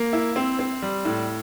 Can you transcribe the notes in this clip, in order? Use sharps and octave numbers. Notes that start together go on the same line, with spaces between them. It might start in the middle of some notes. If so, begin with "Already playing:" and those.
Already playing: A#3
E4
C4
C4
G3
A2